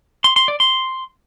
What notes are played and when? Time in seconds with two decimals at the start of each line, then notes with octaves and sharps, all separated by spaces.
0.24 C6
0.36 C6
0.48 D5
0.60 C6